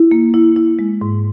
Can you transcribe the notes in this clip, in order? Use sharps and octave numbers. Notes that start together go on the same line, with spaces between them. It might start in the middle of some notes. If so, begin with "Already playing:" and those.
Already playing: E4
A#3
E4
E4
G#3
G#2